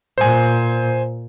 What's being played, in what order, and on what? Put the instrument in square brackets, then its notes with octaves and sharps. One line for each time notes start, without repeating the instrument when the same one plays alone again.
[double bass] A#2 [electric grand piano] C5 G#5